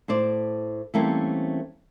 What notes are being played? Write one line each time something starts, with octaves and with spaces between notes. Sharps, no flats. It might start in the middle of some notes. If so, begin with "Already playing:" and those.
A2 C5 D5
E3 G3 A3 A#3 C4 C#4